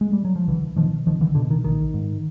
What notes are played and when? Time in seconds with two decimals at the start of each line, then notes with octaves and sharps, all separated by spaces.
0.01 G#3
0.13 G3
0.25 F#3
0.36 F3
0.48 C2 D3 E3
0.76 B2 D#3 F3
1.06 C2 D#3 F3
1.21 D3 E3
1.35 B2 D3
1.50 D#3
1.64 A#1 D#3
1.94 G#2